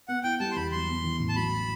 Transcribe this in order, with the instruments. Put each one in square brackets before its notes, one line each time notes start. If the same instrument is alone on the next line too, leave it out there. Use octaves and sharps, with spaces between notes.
[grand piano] B3 [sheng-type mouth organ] F#5
[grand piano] E4 [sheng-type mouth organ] G5
[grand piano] G3 [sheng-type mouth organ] A5
[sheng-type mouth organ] C6
[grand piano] E2 [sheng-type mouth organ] B5
[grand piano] F#3 [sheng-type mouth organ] C6
[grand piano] B3
E3
A1
[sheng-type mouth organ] A5
[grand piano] F#3 [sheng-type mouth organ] B5